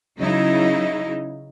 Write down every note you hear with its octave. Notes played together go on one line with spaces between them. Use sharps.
C#3 F#3 D#4 E4